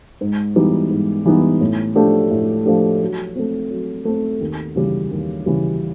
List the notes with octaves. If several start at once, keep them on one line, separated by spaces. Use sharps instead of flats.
G#2
E3 G3 B3 D#4
G#2
E3 G3 B3 D#4
A2
F3 A3 D4 G4
A2
F3 A3 D4 G4
F#3
A3 C4
F#3
A3 C4
D#2
C#3 E3 G3
D#2
C#3 E3 G3